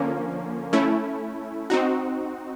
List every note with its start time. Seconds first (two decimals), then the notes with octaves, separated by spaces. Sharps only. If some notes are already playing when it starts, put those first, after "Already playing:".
Already playing: D3 F3 A#3 C#4
0.73 A3 C#4 E4
1.70 C4 D#4 F#4